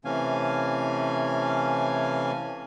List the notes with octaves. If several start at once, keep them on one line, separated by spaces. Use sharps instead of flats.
C3 E3 A3 C#4 F5 G#5